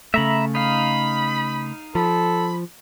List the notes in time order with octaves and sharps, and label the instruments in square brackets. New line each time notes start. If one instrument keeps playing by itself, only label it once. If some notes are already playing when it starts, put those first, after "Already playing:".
[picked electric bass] C#3 A3 [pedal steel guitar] E5 A#5 B5
[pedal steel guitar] D#4 F5 [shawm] B5
[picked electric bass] F3 [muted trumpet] A4 [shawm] B5